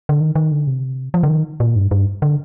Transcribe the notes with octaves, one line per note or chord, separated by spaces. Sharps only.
D3
D#3
D#3
D3
C3
F3
D3
D#3
A#2
G2
G2
D3